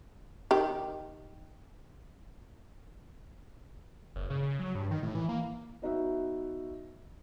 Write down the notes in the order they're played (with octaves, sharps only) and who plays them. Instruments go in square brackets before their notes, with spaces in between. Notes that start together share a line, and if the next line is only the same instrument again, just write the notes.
[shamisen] D#3 G4
[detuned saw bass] F#1
C#3
C#3
F#3
G2
D#3
A2
E3
A#3
[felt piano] B3 D#4 F#4 E5